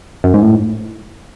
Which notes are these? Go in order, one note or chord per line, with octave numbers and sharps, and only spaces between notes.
F#2
G#2
A2